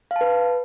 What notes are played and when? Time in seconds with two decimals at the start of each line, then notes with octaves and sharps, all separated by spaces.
0.11 F5
0.16 A5
0.21 B4